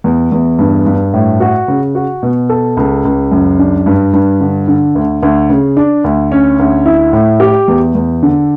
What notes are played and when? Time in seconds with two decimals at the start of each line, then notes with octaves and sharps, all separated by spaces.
0.04 E2
0.32 E2
0.59 G2
0.86 G2
1.13 A2
1.40 F#4
1.68 C#3
1.95 F#4
2.23 B2
2.49 A4
2.77 C#2
3.05 C#2
3.32 F#2
3.59 D4
3.86 G2
4.13 G2
4.41 D3
4.68 D3
4.95 D2
5.23 D2
5.50 C#3
5.77 D4
6.04 D2
6.32 C#4
6.59 D2
6.86 E4
7.13 A2
7.40 G4
7.68 E2
7.95 E2
8.23 D3